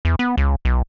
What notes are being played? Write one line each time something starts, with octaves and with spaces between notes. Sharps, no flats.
E2
B3
C#2
B1